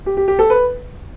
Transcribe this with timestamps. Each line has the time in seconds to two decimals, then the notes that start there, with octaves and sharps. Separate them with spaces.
0.06 G4
0.17 G4
0.28 G4
0.39 A4
0.50 B4